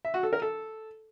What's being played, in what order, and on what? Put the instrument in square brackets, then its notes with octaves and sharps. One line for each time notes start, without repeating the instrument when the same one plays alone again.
[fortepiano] E5
F#4
A4
A#4
A4